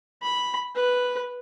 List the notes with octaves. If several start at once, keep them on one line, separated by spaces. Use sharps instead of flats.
B5
B4